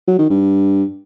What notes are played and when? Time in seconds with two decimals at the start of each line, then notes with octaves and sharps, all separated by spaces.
0.07 F#3
0.19 D#3
0.30 G2